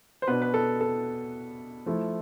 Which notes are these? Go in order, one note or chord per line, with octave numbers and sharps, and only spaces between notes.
C5
B2 B3 D4 B4
B4
A4
A4
F3 A3 E4